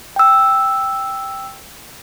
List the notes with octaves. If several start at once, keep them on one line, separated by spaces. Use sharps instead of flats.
G5 E6